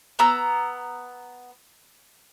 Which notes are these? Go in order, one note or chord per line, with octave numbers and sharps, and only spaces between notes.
B3 A#5 E6